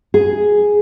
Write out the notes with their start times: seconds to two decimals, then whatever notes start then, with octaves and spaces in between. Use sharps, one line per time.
0.14 G#4